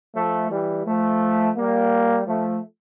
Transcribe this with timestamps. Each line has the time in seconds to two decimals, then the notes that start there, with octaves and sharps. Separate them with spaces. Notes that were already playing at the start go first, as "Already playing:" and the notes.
0.15 F3 A3
0.50 E3 G3
0.86 F3 A3
1.57 G3 A#3
2.27 F3 A3